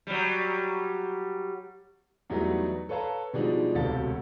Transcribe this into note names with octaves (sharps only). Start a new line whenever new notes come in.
F#3 G3
E2 F#3 G3 A3 B3 D#4
A4 B4 C#5 F5 A5 A#5
B2 F3 G3 G#3 D4 D#4
E1 D2 C3 A4 F5 A6